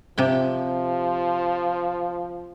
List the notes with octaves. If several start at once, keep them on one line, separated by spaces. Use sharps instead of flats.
C3 F3 G4 G5